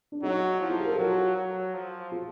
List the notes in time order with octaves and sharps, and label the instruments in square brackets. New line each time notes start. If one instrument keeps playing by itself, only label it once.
[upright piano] D4
[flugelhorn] F#3 [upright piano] D#4
[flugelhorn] F3 [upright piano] E4
[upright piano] F4
G4
A#4
A4
[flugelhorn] F#3 [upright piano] F#4
[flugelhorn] F#3
F3
[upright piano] F4